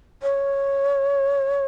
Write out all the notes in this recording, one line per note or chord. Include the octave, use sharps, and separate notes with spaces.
C#5